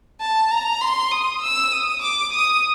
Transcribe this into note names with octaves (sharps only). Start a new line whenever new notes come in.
A5
A#5
C6
D#6
E6
D#6
D6
D#6